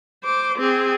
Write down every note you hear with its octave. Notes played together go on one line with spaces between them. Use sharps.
C5 D6
C4 G#4